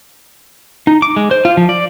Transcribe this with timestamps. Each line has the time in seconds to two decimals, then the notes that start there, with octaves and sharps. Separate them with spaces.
0.87 D#4
1.02 D6
1.16 G#3
1.31 C5
1.45 F4
1.57 F3
1.69 D5